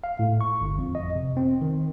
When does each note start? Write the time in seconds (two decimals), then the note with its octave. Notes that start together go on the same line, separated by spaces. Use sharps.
0.04 F5
0.19 A2
0.41 C#6
0.61 G1
0.78 F2
0.95 D#5
1.15 C3
1.37 C4
1.62 D#3